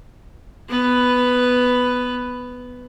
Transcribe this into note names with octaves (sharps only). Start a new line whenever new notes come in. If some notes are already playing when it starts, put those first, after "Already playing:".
B3 B4